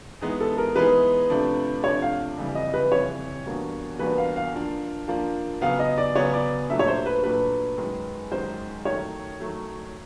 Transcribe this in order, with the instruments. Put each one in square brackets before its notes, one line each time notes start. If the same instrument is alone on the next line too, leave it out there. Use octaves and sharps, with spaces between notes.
[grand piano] E3 G#3 B3 D#4 G#4
[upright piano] A4
A#4
[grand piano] E3 G#3 B3 D#4 G#4 [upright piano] B4
[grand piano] C3 F3 A3 D4
[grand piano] C3 F3 A3 D4 [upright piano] C#5
[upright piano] F5
[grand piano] F2 C#3 E3 G3
[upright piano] D#5
B4
[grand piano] F2 C#3 E3 G3 [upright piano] C#5
[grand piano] E2 B2 G3 A#3 D4
[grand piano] E2 B2 G3 A#3 D4 [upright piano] B4
[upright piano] F5
F5
[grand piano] F3 A#3 D4
F3 A#3 D4
[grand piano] C#3 F#3 B3 [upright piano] F5
[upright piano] D#5
D5
[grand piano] C#3 F#3 B3 [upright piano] C#5
[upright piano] D5
[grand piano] A#2 F#3 A3 D4 [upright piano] E5
[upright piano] C#5
C5
B4
[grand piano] A#2 F#3 A3 D4 [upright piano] B4
[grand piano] F#2 D#3 G#3
[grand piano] F#2 D#3 G#3 [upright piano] C5
[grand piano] D#3 F#3 A3 [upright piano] C#5
[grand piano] D#3 F#3 A3